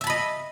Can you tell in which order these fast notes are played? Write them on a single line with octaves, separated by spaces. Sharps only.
E5 A5 B5 D#5